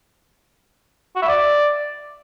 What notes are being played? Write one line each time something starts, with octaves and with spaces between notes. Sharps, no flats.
F#4
E5
D5